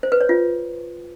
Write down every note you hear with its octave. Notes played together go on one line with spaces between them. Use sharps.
C5
B4
C#5
F4